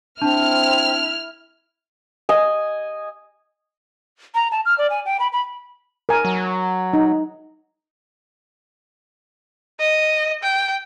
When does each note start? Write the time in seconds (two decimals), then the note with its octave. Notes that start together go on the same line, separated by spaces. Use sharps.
0.21 C4 D4 E4 A5 F6
2.29 D#5 G#5
4.35 A#5
4.52 A5
4.65 F6
4.78 D5
4.90 G#5
5.05 G5
5.20 B5
5.33 B5
6.09 A#4 G#5
6.25 F#3
6.93 D#4
9.79 D#5
10.42 G5